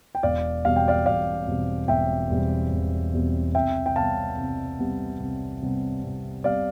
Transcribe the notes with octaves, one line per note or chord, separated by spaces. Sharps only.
G5
E1 D5 F5
E2 B2 G3 C4 F5
G5
D5 F5
E1 D5 F5
E2 B2 G3 C4
E1 E5 G5
E2 B2 G3 C4
E1
E2 B2 G3 C4
C2 E5 G5
G5
C3 G3 B3 F5 A5
C2
C3 G3 B3
C2
C3 G3 B3
C2
C3 G3 B3 D5 F5